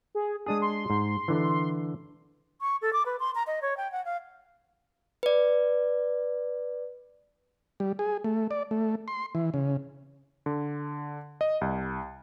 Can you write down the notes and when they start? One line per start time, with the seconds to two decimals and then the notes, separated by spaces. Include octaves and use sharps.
0.15 G#4
0.46 G#3 D4 G#4 D#6
0.62 C6
0.90 G#2
1.28 D3 E3
2.61 C#6
2.82 A4
2.93 D6
3.06 B4
3.20 C6
3.35 A#5
3.47 D#5
3.62 C#5
3.77 G5
3.92 F#5
4.05 F5
5.23 B4 D5
7.80 G3
7.99 G#4
8.24 A3
8.51 D5
8.71 A3
9.08 C6
9.35 E3
9.54 C#3
10.46 D3
11.41 D#5
11.61 C2